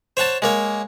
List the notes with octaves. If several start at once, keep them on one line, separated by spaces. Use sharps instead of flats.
C5 C#5 F#5 A5
G#3 A#3 C#5